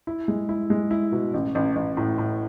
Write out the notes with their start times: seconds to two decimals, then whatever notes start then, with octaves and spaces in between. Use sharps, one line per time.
0.07 E4
0.28 G#3
0.49 E4
0.70 G#3
0.91 E4
1.12 B2
1.34 A1
1.55 A1
1.76 A1
1.97 A2
2.18 A2